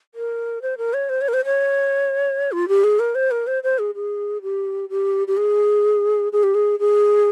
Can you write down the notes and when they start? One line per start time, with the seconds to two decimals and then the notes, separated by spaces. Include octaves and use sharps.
0.15 A#4
0.62 C5
0.78 A#4
0.94 C#5
1.09 C5
1.21 C#5
1.28 A#4
1.34 C5
1.45 C#5
2.52 F4
2.68 G4
2.84 G#4
2.99 A#4
3.15 C5
3.31 A#4
3.47 C5
3.63 C5
3.79 G#4
3.95 G#4
4.42 G4
4.89 G4
5.27 G4
5.37 G#4
6.33 G#4
6.43 G4
6.55 G#4
6.80 G#4